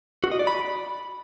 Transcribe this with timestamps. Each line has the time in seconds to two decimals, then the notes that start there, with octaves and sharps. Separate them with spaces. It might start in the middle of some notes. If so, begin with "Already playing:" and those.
0.24 F#4
0.32 D#5
0.39 D5
0.47 B5